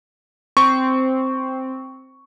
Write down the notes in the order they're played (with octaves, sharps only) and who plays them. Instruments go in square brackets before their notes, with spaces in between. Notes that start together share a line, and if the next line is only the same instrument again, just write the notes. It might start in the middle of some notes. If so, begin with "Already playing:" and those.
[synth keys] C4 [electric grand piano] C#6